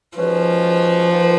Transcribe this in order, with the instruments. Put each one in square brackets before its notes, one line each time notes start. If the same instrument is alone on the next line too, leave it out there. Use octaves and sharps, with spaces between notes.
[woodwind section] D#3 G#3 C#4 F#4 B4 [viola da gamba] F3
[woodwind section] D#3 A#3 F4 B4